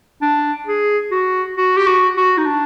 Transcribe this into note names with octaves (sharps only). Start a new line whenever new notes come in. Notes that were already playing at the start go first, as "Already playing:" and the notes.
D4
G#4
F#4
F#4
G4
F#4
F#4
D#4
D4